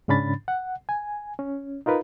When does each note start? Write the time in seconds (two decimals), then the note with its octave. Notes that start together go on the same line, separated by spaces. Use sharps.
0.08 G#2 C#3 C#4 D4 B5 A6
0.48 F#5
0.89 G#5
1.39 C#4
1.86 D#4 F4 A#4 B4